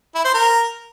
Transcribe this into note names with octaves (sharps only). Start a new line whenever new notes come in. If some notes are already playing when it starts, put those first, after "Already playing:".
E4
C5
A#4